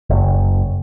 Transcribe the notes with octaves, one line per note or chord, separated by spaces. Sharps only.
F#1